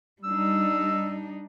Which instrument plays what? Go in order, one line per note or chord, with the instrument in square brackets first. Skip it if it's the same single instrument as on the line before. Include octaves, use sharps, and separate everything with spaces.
[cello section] G3 D4 D#4 [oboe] E6